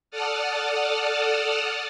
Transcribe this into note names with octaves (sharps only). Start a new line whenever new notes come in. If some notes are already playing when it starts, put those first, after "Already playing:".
A4 D5 F#5 A5 D#6 F6